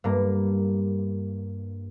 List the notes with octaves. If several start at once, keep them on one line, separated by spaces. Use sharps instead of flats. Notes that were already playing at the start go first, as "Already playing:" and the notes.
G2 A#3